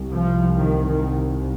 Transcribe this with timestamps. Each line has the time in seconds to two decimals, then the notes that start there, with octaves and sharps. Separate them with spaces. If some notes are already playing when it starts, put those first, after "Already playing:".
Already playing: C2 C3
0.12 F3
0.57 D#3
0.86 D#3